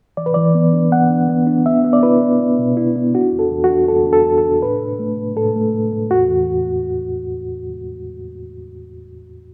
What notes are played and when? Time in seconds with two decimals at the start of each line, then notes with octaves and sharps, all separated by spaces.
0.17 E3 D5
0.26 B4
0.34 E3 D5
0.55 B3
0.73 D4
0.92 B3 F#5
1.10 D4
1.29 B3
1.47 D4
1.66 B3 E5
1.84 B3
1.93 D5
2.03 E4 B4
2.21 B3
2.40 B3
2.59 B2
2.77 E4
2.96 B3
3.14 D4 F#4
3.32 E2
3.39 A4
3.51 E2
3.64 F#4
3.70 D4
3.88 E2 A4
4.07 D4
4.13 A4
4.26 E2
4.38 A4
4.44 D4
4.62 A2 B4
4.81 A2
4.99 A3
5.18 A2
5.36 A2 A4
5.56 A3
5.74 A2
5.92 A2
6.10 E2 F#4
6.29 E2